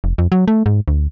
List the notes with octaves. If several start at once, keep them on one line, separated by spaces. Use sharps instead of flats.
F1
F2
F#3
A3
G#2
D2